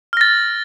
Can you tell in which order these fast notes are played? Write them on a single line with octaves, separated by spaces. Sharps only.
F6 A#6 A6